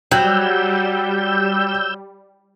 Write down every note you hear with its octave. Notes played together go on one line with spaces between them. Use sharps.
F#3 G3 G5 E6 G6